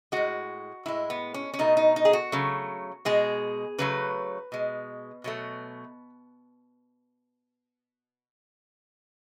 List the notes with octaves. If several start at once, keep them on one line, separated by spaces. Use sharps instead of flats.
A2 G#3 F#4
A2 G#3 E4
B3
C#4
C#4
B2 A3 D#4
D#4
D#4
G#4
F#4
C#3 F#3 A3
B2 G#3 G#4
C#3 F#3 A3 B4
B2 G#3
B2 F#3 A3